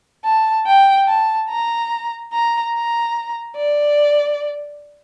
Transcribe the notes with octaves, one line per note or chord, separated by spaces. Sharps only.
A5
G5
A5
A#5
A#5
A#5
D5